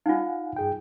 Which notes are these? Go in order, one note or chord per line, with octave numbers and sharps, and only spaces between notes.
D#4 F4 F5 F#5 G#5
G2 G#4 G5